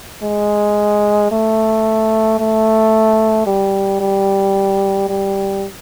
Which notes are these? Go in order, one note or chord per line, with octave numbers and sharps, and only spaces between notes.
G#3
A3
A3
G3
G3
G3